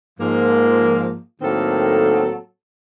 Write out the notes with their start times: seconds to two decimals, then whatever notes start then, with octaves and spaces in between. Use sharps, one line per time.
0.19 G#2 F3 A#3
1.42 A2 D#3 F#3 A#3 C4 A4